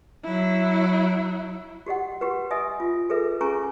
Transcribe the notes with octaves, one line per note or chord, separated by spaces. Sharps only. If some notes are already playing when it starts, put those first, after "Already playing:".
F#3 E4
F#4 G4 D#5 F#5
F#4 G4 B4
D#5 E5 G#5 D#6
F4
G#4 A4 B4 E5
C#4 G#4 G#5 A#5 C#6